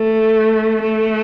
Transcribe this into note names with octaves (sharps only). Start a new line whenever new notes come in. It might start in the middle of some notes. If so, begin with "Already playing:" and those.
Already playing: A3
A3